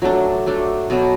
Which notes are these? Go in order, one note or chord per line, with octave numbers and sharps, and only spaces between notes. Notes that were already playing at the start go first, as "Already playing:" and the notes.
F#3 A3 D4
F#3 A3 D4
B2 F#3 B3